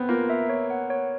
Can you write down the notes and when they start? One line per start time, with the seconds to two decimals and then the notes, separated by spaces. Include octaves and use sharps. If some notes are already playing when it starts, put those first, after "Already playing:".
Already playing: B3 C4
0.09 A#3 F4
0.30 E5
0.49 C#5
0.70 F#5
0.90 C#5